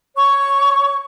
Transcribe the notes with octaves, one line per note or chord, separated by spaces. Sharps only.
C#5 C#6